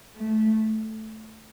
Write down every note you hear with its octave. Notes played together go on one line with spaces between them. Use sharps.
A3